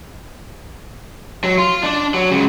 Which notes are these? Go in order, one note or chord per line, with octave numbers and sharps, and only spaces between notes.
F#3
F4
D4 D5
F#3
C#2 C#3